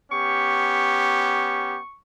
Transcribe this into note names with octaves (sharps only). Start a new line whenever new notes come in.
B3 C#4 G4 C#6